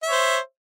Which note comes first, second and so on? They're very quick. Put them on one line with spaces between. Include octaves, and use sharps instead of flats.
E5 C#5 C5